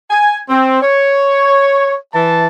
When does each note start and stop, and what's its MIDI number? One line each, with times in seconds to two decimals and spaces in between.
0.11 0.39 80
0.49 0.81 60
0.82 1.94 73
2.13 2.47 52
2.13 2.47 81